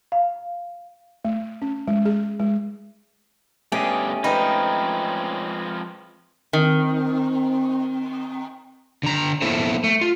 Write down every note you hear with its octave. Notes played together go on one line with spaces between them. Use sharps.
F5
A3
C#4
G#3
G#4
G#3
G2 A3 B3 C#4 G4 G#4 D#5 G#5
F3 G#3 C4 D#4 B4 G5 B5
D#3 C4
D3 A#5
A#3 B3 E4 A4 C5
A3
F4